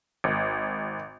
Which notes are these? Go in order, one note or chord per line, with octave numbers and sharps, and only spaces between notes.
G#1